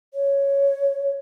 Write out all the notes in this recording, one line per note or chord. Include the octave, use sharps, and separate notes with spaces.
C#5